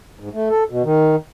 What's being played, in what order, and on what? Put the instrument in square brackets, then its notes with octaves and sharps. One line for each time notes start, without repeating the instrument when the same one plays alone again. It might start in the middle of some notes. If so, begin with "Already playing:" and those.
[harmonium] G#2
A3
A4
B2
D#3